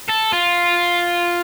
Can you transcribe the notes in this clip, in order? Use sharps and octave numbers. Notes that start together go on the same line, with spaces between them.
A4
F4